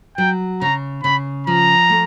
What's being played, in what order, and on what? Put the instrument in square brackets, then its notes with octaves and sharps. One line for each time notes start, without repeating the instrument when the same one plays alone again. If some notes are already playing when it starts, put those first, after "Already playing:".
[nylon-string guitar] F#3 [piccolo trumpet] G5
[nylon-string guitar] C#3 [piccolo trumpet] A#5
[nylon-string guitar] C#3 [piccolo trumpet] B5
[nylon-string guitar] F3 [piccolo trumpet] A#5
[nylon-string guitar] A3